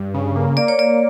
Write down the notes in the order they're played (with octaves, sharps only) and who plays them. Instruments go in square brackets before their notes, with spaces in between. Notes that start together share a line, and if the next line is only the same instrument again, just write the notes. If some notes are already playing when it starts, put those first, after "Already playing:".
Already playing: [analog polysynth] G2
C#3
A#3
[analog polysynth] A#3 [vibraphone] D5
[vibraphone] C#5
[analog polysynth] A#3 [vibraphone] D5